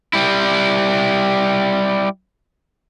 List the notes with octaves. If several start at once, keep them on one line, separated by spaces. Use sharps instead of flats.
G3 E4